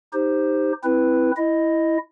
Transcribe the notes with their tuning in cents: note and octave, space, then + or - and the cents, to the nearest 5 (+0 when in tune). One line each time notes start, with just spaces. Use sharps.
D#4 +0 G4 +15 C5 +0
C4 +0 E4 +5 B4 +0
E4 +0 D#5 +0